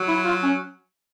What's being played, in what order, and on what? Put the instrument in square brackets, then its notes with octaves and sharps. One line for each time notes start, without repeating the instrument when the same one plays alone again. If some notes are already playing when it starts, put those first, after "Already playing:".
Already playing: [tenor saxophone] F#3
[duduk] E4
F4
C#4